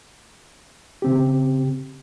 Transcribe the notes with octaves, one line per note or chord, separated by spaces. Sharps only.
C#3 C4 G4